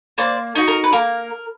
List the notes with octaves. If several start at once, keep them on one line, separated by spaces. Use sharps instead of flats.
A#3 C5 D5
D#4 F#4
A#4
B4
A#3 A#4